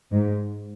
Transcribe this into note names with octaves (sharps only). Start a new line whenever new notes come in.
G#2